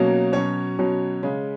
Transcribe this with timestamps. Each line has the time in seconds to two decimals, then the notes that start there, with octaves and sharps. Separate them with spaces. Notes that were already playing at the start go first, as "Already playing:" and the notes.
Already playing: B2 F#3 A#3 C#4
0.32 B2 F#3 C#4 C#5
0.79 B2 F#3 C#4
1.23 C#3 G#3 C#4